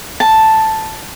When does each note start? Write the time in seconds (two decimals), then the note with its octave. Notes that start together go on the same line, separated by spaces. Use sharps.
0.20 A5